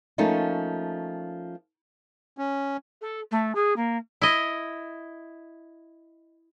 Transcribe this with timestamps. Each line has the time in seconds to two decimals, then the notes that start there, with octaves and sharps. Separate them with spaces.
0.18 F3 A3 A#3 C#4 D#4 F4
2.38 C#4
3.02 A4
3.31 A3
3.55 G#4
3.76 A#3
4.22 E4 D#5